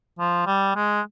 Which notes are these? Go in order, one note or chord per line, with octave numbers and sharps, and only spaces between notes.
F3
G3
G#3